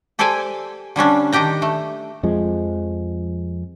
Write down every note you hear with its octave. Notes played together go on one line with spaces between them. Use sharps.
G4 A4 C5 D5 G5 G#5
D3 G3 C#4 D4
D#3 D4 G4 G5 A#5
A3
F2 F3 G#3